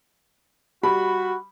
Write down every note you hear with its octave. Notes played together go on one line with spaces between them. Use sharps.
G3 F#4 B5